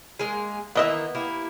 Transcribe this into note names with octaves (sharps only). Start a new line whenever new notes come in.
G#3 A#3 G#4
D#3 E3 A#3 B3 D#5 E5
A#3 E4 G4